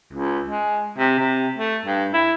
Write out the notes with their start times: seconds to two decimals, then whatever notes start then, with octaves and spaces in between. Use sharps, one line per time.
0.13 C#2
0.48 G#3
0.98 C3
1.19 C3
1.58 A3
1.86 G2
2.13 E4